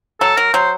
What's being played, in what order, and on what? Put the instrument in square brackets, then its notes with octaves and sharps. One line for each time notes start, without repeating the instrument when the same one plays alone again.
[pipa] F#3 [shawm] A4
[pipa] F#3 [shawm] A#4
[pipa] F#3 [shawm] C5